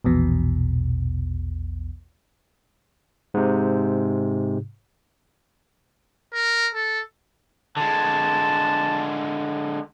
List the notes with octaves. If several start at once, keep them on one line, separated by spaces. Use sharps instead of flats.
A#1 E2 B2
G#2 C3
A#4
A4
D3 G#3 A5